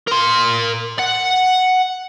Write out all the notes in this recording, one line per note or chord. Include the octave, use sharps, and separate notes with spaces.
A#4 C6
F#5